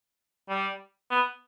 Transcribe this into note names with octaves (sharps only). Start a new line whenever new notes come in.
G3
B3